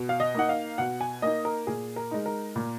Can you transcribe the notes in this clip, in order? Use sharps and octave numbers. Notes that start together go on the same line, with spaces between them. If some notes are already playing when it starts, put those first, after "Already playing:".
Already playing: B2
F5
D#5
A#3 D#4 F#5
F5
B2 F#5
G#5
A#3 D#4 D#5
A#4
A#2 G#4
A#4
G#3 D#4
A#4
A#2